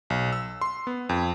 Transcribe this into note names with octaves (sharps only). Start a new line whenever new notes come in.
B1
E6
C6
B3
F2